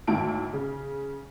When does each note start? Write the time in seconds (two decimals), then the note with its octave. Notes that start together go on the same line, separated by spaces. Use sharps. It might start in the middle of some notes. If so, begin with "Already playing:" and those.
0.07 G#1 D2 D#3 E4 A5 D7
0.53 C#3